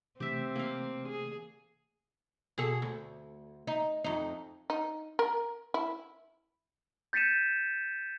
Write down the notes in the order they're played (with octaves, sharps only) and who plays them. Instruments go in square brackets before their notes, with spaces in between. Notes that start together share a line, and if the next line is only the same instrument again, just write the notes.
[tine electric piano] C3 E3 A3 [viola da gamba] C4 [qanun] G4 E5
[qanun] A#3 F5
[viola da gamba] G#4
[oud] B2 G#4 A4
D2
D#4
F2 D#4
[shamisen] D#4
A#4
E4
[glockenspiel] G6 A6 B6 C#7 D#7 E7